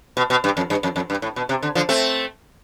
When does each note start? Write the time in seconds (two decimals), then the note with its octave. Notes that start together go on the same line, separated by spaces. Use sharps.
0.17 B2
0.30 B2
0.44 G2
0.57 F2
0.70 G2
0.83 F2
0.96 F2
1.10 G2
1.22 A2
1.36 B2
1.49 C3
1.62 D3
1.75 D3 F3
1.89 A3 C4